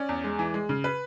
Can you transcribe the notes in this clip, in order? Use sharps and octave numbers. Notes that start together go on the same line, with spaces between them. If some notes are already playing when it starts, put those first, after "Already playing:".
Already playing: C#4 D5
E2
G#3
E3
G#3
C#3
B4